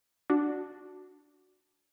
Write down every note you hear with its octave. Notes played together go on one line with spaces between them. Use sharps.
D4 F#4